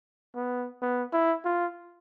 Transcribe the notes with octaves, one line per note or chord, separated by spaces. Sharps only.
B3
B3
E4
F4